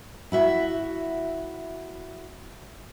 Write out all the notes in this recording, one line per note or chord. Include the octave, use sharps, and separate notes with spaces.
E4 F#4 E5